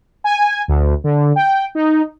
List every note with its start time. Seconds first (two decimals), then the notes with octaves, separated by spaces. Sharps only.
0.24 G#5
0.68 D2
1.04 D3
1.36 G5
1.75 D#4